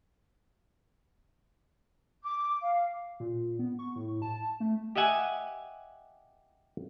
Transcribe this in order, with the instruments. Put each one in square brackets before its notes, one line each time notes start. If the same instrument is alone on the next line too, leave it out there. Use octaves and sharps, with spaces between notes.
[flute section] D6
F5
[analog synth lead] A#2
B3
C#6
A2
A5
A3
[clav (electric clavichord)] G4 D#5 E5 F#5 G#5